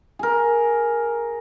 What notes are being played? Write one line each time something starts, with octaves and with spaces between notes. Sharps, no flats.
G#4 A#4